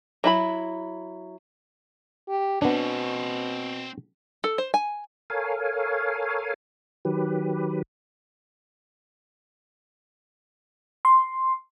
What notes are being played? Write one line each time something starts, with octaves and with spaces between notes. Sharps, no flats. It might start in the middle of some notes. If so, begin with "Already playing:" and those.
F#3 E4 B5
G4
B2 B3 C4 D4 C#5
A4
C5
G#5
A4 A#4 C#5 F5 G#5
D#3 F#3 G4 B4
C6